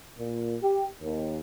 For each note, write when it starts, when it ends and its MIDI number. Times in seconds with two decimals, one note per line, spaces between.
0.18 0.55 46
0.62 0.86 67
1.02 1.40 39